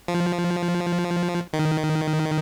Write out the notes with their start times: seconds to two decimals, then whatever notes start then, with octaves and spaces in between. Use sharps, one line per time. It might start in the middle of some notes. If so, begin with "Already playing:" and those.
0.08 F3
1.53 D#3